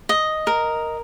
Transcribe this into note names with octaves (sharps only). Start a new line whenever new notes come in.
D#5
A#4